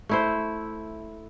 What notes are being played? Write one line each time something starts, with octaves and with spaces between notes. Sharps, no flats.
A3 E4 C5